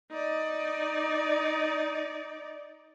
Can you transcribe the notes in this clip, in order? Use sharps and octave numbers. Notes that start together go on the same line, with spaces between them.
D#4 D5